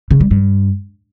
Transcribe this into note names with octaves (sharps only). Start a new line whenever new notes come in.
C#3
G3
G2